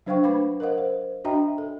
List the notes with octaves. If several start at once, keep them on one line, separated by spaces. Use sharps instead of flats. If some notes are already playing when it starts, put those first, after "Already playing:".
F#3 D4 C5 F5 G5 C#6
A3 D4 B4 B5 D6
A#4 C5 D#5 F5 F#5
C5
D4 F#4 D#5 E5 G5 A#5
A4